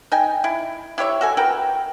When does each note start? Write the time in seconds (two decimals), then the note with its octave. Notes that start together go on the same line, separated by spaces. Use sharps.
0.12 D#4 G5 G#5
0.44 E4
0.98 E4 G4 C#5 E5
1.21 F#4 A4 G#5
1.37 F#4 A#4 B4 G5